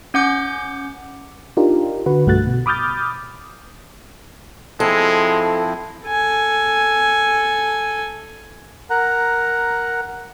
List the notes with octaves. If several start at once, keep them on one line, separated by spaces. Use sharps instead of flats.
C#4 F#5 D6 G6
D4 D#4 F4 G4 A#4
D3 F#4 B4
B1 G2 A3 F#4 F#6 A6
B2
B5 D6 D#6 F6 G6 A6
F3 G#3 C4 E4 A4
A4 G#5
A#4 F#5 A#5 F#6